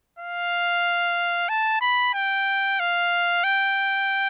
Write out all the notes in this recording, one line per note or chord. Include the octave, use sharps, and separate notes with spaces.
F5
A5
B5
G5
F5
G5